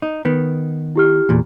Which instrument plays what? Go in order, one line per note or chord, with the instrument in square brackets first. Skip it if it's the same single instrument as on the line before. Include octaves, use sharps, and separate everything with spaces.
[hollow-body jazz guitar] D#4
D#3 B3
[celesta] E4 G4 F6
[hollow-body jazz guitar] E2 A#2